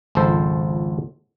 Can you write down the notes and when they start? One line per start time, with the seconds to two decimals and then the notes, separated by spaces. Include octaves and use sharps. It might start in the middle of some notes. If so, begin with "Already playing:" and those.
0.15 G#1 C#2 F3 A4 C5